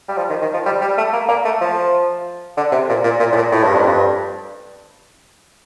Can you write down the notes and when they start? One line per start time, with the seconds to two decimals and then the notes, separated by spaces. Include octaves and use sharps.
0.08 G3
0.17 F3
0.30 D#3
0.41 D#3
0.54 F3
0.66 G3
0.81 G3
0.98 A3
1.13 A#3
1.29 A#3
1.45 A3
1.61 F3
2.57 D3
2.72 C3
2.89 A#2
3.04 A#2
3.20 A#2
3.32 A2
3.36 A#2
3.52 A2
3.63 G2
3.75 F2
3.86 G2